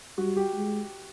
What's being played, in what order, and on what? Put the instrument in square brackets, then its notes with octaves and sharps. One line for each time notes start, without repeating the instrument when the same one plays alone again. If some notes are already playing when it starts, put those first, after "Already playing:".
[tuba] G3 [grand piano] F#4
[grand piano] G4
[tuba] G#3